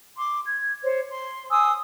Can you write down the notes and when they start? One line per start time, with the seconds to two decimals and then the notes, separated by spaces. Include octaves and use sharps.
0.16 C6 D6
0.45 G#6
0.83 C5 C#5
1.10 C6
1.50 G#5 C6 D#6 E6